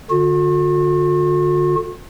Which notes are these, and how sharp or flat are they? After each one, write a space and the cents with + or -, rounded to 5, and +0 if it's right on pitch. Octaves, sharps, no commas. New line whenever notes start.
D3 +0 F#4 -45